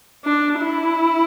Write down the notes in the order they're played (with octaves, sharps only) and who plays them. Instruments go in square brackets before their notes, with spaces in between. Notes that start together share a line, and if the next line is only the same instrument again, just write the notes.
[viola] D4
E4